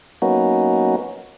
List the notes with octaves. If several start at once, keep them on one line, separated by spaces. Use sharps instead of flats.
F#3 A#3 B3 C#4 D#4 F#4